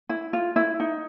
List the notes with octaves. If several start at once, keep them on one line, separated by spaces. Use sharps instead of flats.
E4
F4
E4
D#4